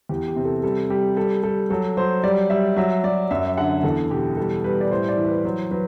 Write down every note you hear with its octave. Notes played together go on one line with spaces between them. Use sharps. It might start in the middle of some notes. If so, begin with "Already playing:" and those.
E2 G4
G4
C3
A4
G3 A4
G3 G4
G3 A4
G3 A4
F#3 A4
F#3 C5
G3 D5
G3 E5
F#3 E5
F#3 D5
F#2 E5
D3 F#5
E2 A4
B2 G4
G3 A4
G3 B4
D5
A2 C5
D5
E3
B4
F#3 C5
F#3 B4